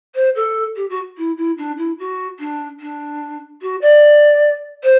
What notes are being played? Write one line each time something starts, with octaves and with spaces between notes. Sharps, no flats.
C5
A4
G4
F#4
E4
E4
D4
E4
F#4
D4
D4
F#4
D5
C5